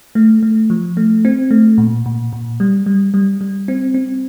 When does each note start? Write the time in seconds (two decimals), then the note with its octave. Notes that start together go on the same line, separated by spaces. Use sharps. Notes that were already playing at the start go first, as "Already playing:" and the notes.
0.15 A3
0.43 A3
0.70 F3
0.97 A3
1.25 C4
1.51 A3
1.78 A#2
2.06 A#2
2.33 A#2
2.60 G3
2.86 G3
3.14 G3
3.41 G3
3.68 C4
3.94 C4